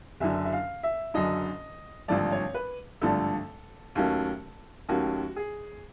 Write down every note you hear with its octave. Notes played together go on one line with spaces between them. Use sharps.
F#1 F#2 D3 E5
E5
F5
E5
F#1 F#2 D3 D#5
G#1 G2 D3 F3 A3 D5
C#5
B4
G#1 G2 D3 F3 A3 A4
D#2 D#3 F#3 A3 C#4
D#2 D#3 F#3 A3 C#4 F#4
G#4